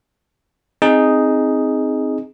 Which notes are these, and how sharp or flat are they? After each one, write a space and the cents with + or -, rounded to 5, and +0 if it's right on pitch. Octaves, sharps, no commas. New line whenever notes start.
C4 +0 D#4 +0 G#4 +0